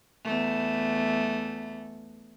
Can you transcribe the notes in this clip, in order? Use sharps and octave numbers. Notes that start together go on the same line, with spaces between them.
E2 A3